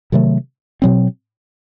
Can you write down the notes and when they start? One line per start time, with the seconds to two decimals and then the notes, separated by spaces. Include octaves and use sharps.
0.12 C3 D#3 F#3 A3
0.82 B2 F#3 C4